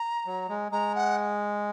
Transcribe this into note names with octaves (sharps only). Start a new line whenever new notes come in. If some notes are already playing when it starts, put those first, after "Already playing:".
Already playing: A#5
F#3
G#3
G#3 A#5
F#5